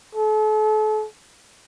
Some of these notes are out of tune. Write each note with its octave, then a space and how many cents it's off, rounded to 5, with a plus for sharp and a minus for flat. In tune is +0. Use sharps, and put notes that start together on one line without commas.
A4 -40